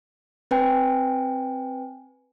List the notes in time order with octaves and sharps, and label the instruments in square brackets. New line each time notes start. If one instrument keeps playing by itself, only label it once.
[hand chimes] C4 B4 G5 G#5